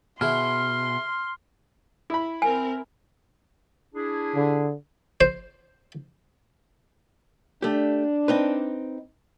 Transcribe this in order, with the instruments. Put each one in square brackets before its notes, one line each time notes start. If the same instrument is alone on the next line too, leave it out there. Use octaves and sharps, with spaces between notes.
[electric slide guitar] B2 [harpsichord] E4 G#4 C#5 [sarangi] C6 [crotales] F6
[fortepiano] E4 B5
[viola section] C4 A#4 [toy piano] G#5
[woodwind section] D4 E4 G#4
[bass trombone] D3
[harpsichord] C5
[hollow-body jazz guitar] A3 G4 [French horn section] D4
[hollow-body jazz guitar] C4 D#4 B4